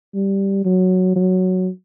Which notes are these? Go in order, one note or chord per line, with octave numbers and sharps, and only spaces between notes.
G3
F#3
F#3